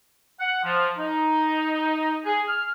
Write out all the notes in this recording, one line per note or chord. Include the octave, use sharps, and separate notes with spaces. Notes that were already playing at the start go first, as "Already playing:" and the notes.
F#5
F3
D#4
G#4
F6